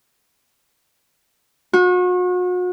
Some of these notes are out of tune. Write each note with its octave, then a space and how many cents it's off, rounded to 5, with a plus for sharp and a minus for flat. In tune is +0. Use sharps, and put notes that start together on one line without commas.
F#4 -40